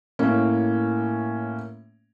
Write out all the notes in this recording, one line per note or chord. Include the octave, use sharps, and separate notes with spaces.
A2 A#3 C#4